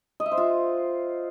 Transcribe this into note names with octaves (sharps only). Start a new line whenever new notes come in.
D#5
E5
C5
F4